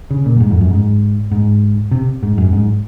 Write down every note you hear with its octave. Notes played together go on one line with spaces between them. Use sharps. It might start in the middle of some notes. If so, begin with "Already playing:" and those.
C#3
A#2
F#2
G#2
F2
F#2
G#2
G#2
C3
G#2
F#2
G#2